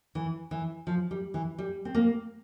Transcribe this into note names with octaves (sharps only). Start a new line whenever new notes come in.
E3
E3
F3
G3
E3
G3
C4
A#3